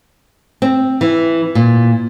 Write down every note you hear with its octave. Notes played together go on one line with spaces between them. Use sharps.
C4
E3
A#2